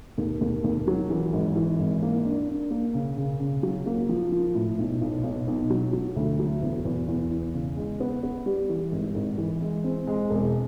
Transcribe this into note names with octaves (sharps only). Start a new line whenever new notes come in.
D#2
D#2
D#2
F#3
E3
G#1
E3
G#1
A#3
D4
D4
A#3
C#3
C#3
C#3
F#3
A#3
F3
F3
A2
B1
B1
B1
B1
F#3
F#3
D2
F#3
E2
E2
E2
E2
C#3
G#3
B3
B3
G3
E3
G#1
G#1
E3
G#3
C4
G#3
E1